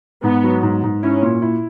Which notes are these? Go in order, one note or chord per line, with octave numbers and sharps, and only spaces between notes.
G#2 B3
F#3
G#2
G#2
C#4 E4
A#2
E4